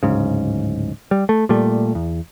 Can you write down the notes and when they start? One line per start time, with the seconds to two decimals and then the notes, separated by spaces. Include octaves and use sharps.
0.03 D1 G#2 C#3
1.11 G3
1.29 A3
1.49 A#2 G3 A3
1.95 E2